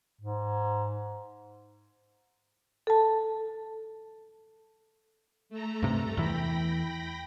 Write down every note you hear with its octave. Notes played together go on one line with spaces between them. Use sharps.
G#2
A4 A5
A3 A4 A#5
G2 C3
E2 E3 G5 B5 A#6